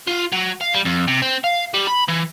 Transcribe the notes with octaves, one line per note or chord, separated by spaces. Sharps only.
F4
F#3
F5
G3
F2
C3
C4
F5
G3
B5
E3